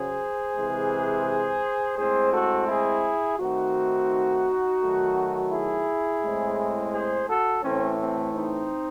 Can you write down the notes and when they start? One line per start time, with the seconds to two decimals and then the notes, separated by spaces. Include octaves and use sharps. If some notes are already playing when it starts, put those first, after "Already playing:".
Already playing: C#3 F#3 G#4 C5
0.57 C3 E3 G#3
1.97 A2 G#3 C4 G#4 C5
2.33 F#4 A4
2.69 E4 G#4
3.39 D#3 A3 C4 D#4 F#4
4.80 D#3 F#3 A3
5.51 E4 G#4
6.22 A2 G#3 C4
6.92 G#4 C5
7.27 F#4 A4
7.63 A2 E3 A3 C4 C#4
7.98 C4
8.34 C4 D#4